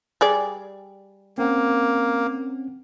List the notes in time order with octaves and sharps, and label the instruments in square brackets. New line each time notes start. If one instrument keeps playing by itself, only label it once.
[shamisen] G3 G#4 D5
[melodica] A#3 [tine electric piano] C4 C#4 F#5